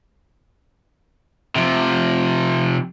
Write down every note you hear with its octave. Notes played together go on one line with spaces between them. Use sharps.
C3 F3